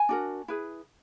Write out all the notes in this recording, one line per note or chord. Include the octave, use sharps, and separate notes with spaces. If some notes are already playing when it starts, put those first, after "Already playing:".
Already playing: G#5
D4 F#4 A#4
E4 G#4 B4